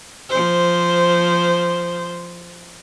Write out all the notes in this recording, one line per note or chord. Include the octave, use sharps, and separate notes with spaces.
F3 C5